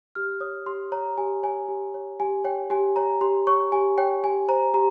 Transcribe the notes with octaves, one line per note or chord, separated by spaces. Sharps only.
G4 F6
C#5 D#6
G4 C6
C#5 A#5
G4 G#5
C#5 G#5
G4
C#5
G4 G#5
C#5 G5
G4 G#5
C#5 A#5
G4 C6
C#5 C#6
G4 G#5
C#5 G5
G4 G#5
C5 A#5
G4 A#5